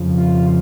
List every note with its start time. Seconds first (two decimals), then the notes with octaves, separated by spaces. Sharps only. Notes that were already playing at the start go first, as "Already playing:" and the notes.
Already playing: F2 C#3 F3
0.16 F4